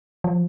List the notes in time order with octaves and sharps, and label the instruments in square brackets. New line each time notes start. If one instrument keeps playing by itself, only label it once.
[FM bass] F3